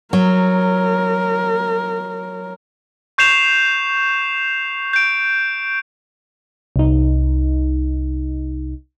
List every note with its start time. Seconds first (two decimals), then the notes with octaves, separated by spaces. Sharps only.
0.13 F#3 A#4
3.18 C#6 G6 C7 E7 F7
4.93 G6 D7
6.76 C2 D#4